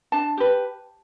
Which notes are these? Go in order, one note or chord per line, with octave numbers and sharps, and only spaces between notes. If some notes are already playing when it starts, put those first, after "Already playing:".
D4 A5
G4 B4